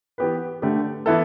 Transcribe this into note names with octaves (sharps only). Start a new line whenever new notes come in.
E3 B3 G4 B4
D3 A3 G4
E3 B3 E4 A4